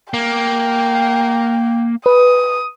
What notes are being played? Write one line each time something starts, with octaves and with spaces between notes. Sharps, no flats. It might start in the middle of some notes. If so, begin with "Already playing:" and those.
A#3 G5
B4 D#6